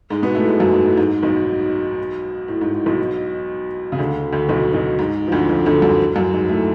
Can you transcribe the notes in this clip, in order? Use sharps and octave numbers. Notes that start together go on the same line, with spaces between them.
G#2 G#3
B2 B3
A2 A3
G#2 G#3
F#2 F#3
G#2
A2
G#2
B1 B2
A2
G#2
A2
B1 B2
C#3
D2 D3
D2 D3
B1 B2
B1 B2
G#2
F3
D2 D3
F2 F3
D2 D3
F#2 F#3
F#2 F#3
G#2 G#3
A2 A3